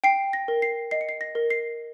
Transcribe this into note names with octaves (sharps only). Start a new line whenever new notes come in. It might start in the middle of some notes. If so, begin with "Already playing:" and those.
G5 C7
A#6
A#4
C7
D#5 C7
C#7
C7
A#6
A#4
C7